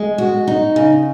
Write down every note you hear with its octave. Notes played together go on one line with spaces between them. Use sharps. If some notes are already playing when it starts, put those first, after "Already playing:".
Already playing: G#3
F#4
D#4
C#3